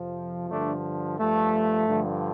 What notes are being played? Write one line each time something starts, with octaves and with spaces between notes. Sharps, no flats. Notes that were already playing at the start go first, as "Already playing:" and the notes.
Already playing: F2 C3 F3
G2 D3 F3 A3 D4
G2 F3 A3
G2 D3 F3